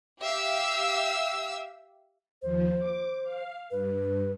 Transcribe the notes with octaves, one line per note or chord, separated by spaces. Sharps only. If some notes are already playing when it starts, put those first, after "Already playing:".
G4 E5 F5 E6
D#2 F3 C5
D6
F5
G2 B4